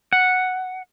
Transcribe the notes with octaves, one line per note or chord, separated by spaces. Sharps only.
F#5